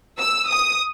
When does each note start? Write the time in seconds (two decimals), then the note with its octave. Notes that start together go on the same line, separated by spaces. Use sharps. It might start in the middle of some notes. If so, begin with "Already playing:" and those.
0.19 E6
0.48 D#6